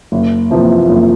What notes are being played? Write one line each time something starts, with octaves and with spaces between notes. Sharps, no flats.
F#1
E2 C3 F3 A#3
F#1